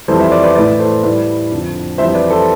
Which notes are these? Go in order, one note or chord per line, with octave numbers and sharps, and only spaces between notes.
F2 E3 G3 A4 C5
C5 E5
B4 D5
B4 D5
A2 E3 A3 B4 D5
A4 C5
A2 G3 B4 D5
F2 D3 F3
F2 E3 G3 C5 E5
B4 D5
A4 C5